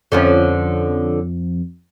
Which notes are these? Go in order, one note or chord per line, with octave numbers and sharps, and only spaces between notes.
F2 D3 F3 C#4